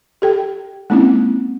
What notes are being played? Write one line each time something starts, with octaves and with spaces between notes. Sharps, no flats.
G4 A4 G5
G#3 A#3 C4 C#4 D#4 E4